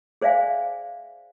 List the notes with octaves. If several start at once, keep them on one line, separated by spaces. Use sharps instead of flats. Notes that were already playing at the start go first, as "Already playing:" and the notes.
G#4 C5 D5 E5 F5 G#5